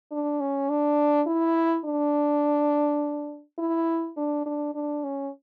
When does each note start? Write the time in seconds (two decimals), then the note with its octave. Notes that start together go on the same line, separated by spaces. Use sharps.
0.11 D4
0.40 C#4
0.69 D4
1.27 E4
1.85 D4
3.59 E4
4.17 D4
4.46 D4
4.75 D4
5.04 C#4